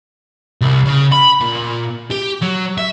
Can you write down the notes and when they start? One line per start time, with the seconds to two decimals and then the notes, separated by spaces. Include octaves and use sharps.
0.61 C2
0.86 C#3
1.12 B5
1.41 A#2
2.11 G4
2.42 F#3
2.78 E5